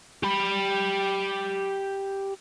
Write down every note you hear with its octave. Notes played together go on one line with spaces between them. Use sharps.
G4 B5